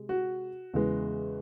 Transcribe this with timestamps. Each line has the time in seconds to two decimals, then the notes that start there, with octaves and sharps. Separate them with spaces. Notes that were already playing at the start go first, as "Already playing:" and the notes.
Already playing: C3 G#3
0.09 F#4
0.73 E2 C#3 E3 G#3